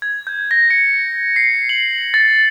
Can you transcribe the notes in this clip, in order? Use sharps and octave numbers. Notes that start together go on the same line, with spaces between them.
G#6
G6
A#6
C#7
C7
F#7
A6